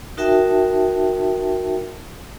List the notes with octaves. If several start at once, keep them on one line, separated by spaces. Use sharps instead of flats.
D#4 F#4 A#4 E5 G5 A5